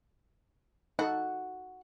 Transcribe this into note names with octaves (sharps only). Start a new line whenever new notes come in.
D#4 F#4 A4 F#5